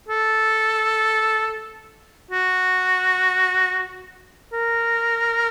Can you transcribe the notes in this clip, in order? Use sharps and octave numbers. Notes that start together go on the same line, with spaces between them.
A4
F#4
A#4